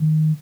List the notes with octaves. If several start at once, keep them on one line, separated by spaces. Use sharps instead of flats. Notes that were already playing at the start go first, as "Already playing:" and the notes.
Already playing: D#3